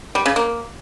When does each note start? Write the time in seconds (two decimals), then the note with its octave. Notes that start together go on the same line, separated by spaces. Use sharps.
0.15 G3
0.26 C#3
0.36 A#3